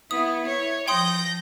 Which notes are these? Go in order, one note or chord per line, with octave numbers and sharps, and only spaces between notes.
B3 E4 D#6
C#5
F3 G5 C6 D#6 G6 A#6